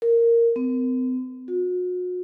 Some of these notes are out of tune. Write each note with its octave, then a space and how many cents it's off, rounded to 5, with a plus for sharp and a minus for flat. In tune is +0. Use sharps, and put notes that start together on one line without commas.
A#4 -5
C4 -45
F#4 -40